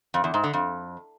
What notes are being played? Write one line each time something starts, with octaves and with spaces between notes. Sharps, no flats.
F2
E2
G#2
D3
F2